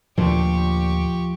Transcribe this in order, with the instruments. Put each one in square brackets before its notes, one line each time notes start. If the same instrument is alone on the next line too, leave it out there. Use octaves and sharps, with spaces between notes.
[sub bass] D#2 [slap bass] A#2 D3 A3 [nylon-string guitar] F3 [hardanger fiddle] G4 C#6